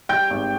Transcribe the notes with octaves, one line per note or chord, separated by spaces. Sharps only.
G3 G5 G6
G#1